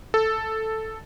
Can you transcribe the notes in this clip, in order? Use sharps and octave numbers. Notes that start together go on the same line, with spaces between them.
A4